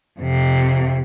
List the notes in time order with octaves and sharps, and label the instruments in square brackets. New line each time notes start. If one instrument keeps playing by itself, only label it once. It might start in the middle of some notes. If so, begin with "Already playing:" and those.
[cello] F2 C3